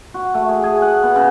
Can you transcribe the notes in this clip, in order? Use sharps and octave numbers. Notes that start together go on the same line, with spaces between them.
F#4
A3
G#4
G#4
F#5
B3
C#3